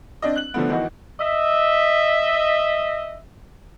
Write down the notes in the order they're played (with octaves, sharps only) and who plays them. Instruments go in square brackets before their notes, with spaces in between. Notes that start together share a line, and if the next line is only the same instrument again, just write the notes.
[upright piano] C4 D4 D5 D#5
F#6 F#7
D3 F3 A3 B3
G#1 D#3 E3 D#4 F#4
[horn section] D#5 E5